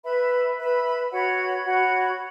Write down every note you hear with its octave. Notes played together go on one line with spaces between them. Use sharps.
B4 E5 B5
B4 E5 B5
F#4 C#5 F#5 B5
F#4 C#5 F#5 B5